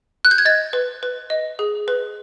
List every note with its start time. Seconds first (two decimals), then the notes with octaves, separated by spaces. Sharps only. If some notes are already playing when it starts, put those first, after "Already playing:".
0.25 F#6
0.31 G6
0.38 G#6
0.45 D#5 A6
0.73 B4
1.03 B4
1.30 D#5
1.59 G#4
1.88 B4